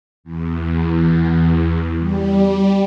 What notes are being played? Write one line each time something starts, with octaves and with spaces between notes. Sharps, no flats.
E2
G3